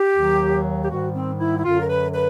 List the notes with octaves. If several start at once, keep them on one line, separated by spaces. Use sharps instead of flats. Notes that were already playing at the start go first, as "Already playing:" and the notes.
Already playing: G4
D#2 D#3 F#3
G4
G#2 D#3 G3 F#4
C4
E4
E4
F#2 D3 F#3 F4
A#4
B4
B4